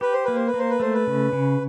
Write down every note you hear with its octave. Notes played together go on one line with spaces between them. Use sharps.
G4 B4
C5
A#3 B4
C5
B4
A#3 C5
B4
A3 C5
B4
C#3
C#3